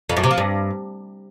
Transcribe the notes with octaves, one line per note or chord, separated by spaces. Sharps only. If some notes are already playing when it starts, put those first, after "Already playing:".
F2
F#2
C3
F3
G2